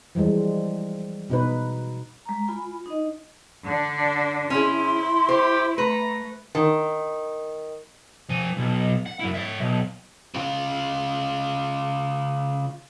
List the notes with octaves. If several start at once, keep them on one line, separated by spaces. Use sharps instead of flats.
E3 F3 G3 G#3
B2 D#4 B4
G#3 A#5
F4 G#5 B5
D#4 D#5
D3 D4
C#4 E4 G#4 C6
G4 C5
A3 B4 A#5
D#3
F3 G#5
B1
F#5
F#2 E4
C#5 E5
B1
C#3 F4